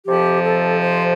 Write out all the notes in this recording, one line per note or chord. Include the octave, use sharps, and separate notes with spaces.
F2 C3 F3 G4
A4
C5